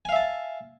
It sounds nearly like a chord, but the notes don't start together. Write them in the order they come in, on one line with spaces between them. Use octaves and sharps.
G#5 F5 E5 A5